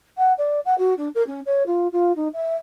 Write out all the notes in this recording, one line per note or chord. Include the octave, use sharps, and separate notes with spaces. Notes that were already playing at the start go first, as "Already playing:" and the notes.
F#5
D5
F#5
F#4
D4
A#4
C#4
C#5
F4
F4
D#4
E5